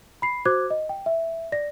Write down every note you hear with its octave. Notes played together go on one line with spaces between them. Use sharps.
B5 C7
F#4 C5 D6 F#6 G#6
D#5
G5
E5
D5 A#6